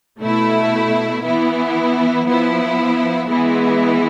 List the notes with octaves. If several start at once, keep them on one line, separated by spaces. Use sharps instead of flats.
B2 A3 E4
E3 B3 E4
F3 B3 E4
E3 G#3 B3 E4